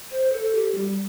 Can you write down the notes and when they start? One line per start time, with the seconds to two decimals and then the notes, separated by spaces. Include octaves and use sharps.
0.11 C5
0.32 A4
0.55 G4
0.75 G3